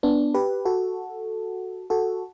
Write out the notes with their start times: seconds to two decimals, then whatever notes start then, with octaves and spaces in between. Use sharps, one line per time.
0.03 B3 D4
0.34 G4 B4
0.65 F#4 A4
1.90 F#4 A4